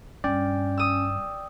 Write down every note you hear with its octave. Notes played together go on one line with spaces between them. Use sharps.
G2 C#4 D5 G5
D#6 E6